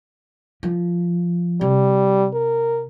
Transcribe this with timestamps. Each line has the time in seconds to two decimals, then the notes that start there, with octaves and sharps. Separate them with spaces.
0.63 F3
1.61 C3 G3
2.33 A#4